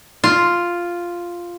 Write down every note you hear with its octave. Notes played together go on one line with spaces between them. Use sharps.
F4